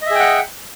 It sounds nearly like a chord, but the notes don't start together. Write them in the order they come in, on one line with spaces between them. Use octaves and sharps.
D#5 E5 G#4 G5 F#5